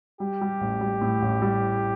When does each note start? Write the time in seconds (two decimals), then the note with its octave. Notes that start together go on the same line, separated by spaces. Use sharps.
0.20 G3 G4
0.41 G3
0.61 A1
0.81 G3
1.01 A2
1.22 A1
1.42 G3